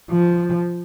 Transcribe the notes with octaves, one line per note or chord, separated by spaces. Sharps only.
F3